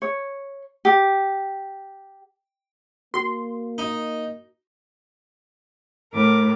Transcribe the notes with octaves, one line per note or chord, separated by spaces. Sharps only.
C#5
G4
A#3 F#4 C6
D#4
A2 A#4 D6